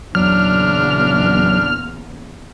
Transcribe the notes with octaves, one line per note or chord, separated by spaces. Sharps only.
E2 A#2 C#3 F#3 D4 F6